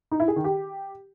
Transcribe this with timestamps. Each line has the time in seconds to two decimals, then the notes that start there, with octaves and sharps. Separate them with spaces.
0.11 D#4
0.20 E4
0.28 G#4
0.36 D#3
0.44 G4